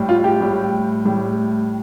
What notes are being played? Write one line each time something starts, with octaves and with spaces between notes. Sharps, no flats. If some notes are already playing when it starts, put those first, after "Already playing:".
Already playing: A2 G3
F4
G4
A2 G3
A2 G3